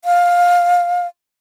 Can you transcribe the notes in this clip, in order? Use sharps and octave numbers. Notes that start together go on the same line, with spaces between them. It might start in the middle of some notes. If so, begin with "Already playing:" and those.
F5